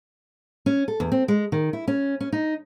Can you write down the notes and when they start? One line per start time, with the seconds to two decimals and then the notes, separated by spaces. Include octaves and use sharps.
0.66 C#4
0.88 A4
1.00 E2
1.12 C4
1.28 G#3
1.52 D#3
1.73 E4
1.88 C#4
2.20 C#4
2.32 D#4